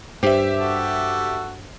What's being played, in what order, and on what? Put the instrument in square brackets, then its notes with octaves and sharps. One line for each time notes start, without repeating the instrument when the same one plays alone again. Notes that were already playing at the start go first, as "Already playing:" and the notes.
[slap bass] G2 [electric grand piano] G4 E5 [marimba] C5
[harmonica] F#4 A4